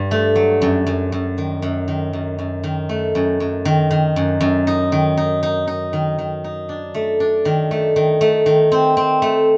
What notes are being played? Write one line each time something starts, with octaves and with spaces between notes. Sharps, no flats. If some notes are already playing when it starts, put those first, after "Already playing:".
Already playing: G2
A3
F#3
F#2
F#2
F#2
D#3
F#2
D#3
F#2
F#2
D#3
A3
F#2
F#2
D#3
D#3
F#2
F#2
D#4
D#3
D#4
D#4
D#4
D#3
D#3
D#4
D4
A3
D4
D#3
A3
D#3
A3
D#3
C4
C4
A3